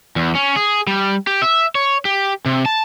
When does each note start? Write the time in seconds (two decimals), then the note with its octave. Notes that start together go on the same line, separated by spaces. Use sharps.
0.16 E2
0.35 C#4
0.56 G#4
0.87 G3
1.27 G4
1.42 E5
1.75 C#5
2.05 G4
2.46 C3
2.66 A5